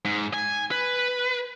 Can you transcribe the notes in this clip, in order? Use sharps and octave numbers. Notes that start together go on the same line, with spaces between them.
G#2
G#5
B4